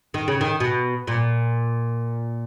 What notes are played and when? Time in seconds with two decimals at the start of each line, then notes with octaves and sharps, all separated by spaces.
0.14 D#3
0.28 C#3
0.41 D#3
0.60 B2
1.07 A#2